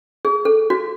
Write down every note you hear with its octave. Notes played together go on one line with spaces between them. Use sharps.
G#4
A4
F#4